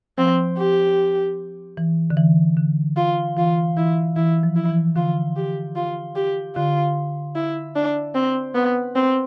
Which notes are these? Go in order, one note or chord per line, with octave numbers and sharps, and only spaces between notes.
F3 C4
G4
E3
D3
E3
D3
F4
E3 F4
E3 E4
E3 E4
F3
E4
E3
D3 F4
G4
F4
G4
D3 F4
E4
D4
C4
B3
C4